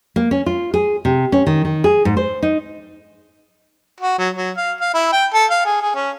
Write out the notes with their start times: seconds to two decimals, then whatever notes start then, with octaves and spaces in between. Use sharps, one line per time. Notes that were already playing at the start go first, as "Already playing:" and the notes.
0.16 A#3
0.31 C#4
0.46 F4
0.74 G#4
1.05 C3
1.32 C#4
1.47 D#3
1.65 D#3
1.84 G#4
2.05 G#2
2.17 C5
2.43 D#4
4.01 F#4
4.18 F#3
4.36 F#3
4.57 F5
4.81 F5
4.94 E4
5.13 G5
5.34 A4
5.51 F5
5.66 G#4
5.82 G#4
5.95 C#4